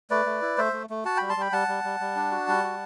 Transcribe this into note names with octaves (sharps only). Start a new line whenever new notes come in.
A3 B4 D5
A3
E4
A3 C5 E5
A3
A3
F#4 F#5 A5
G3 G5 B5
A5 C6
G3 G5 B5
G3 F#5 A5
G3
G3
G3
D4
F#4
G3
F#4